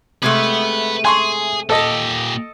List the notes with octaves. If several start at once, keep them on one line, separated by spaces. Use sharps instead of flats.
C3 G#3 A3 B4 F#5
G#4 G#5 C6 C#6
A#2 G4 A4 D#5